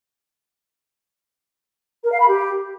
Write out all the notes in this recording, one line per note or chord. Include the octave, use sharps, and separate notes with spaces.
A#4
F5
B5
G4